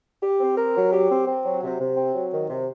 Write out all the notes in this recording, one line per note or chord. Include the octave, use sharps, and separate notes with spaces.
G4
C4
A#4
F#3
G4
C4
C4
F#3
C3
C3
C4
F#3
D#3
C3